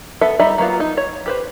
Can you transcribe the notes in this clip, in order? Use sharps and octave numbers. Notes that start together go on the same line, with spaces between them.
B3 A4 B4 E5
G3 D#4 D#5 E5 B5
F#3 A#3 B3 F4
D#4
C#5
G4 B4 C5